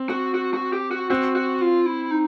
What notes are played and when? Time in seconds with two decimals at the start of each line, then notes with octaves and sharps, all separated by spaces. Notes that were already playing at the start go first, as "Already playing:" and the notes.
Already playing: C4
0.10 F#4
0.35 F#4
0.54 F#4
0.73 G4
0.91 F#4
1.10 C4 F#4
1.36 F#4
1.61 F4
1.86 E4
2.11 D#4